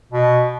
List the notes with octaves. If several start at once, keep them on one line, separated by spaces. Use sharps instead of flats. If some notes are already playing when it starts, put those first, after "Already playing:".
B2